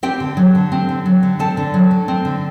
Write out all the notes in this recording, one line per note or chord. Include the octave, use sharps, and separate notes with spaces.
C4 G4 G5
D3
F#3
D3
C4
D3
F#3
D3
C4 A4 A5
D3
F#3
D3
C4
D3